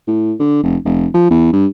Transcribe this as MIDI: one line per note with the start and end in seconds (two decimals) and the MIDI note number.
0.08 0.34 45
0.39 0.63 50
0.63 0.76 29
0.85 1.07 29
1.14 1.26 53
1.31 1.52 40
1.53 1.66 43